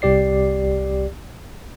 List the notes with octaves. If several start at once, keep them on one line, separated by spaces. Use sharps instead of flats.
C2 G4 D5 C7